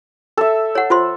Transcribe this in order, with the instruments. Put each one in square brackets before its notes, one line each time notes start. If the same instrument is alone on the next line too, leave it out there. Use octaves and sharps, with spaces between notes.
[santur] A4 E5
[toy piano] C#5 F#5
F4 C5 C6